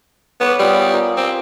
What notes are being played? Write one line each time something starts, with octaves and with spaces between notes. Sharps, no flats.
B3 C#5 B5 D6
G3 B3 F4 G#4
F4 A#4
C4 G4